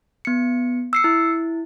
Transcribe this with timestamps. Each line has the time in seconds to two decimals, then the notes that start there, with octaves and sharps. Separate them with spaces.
0.25 B3 C#7
0.93 E6 C7 C#7
1.04 E4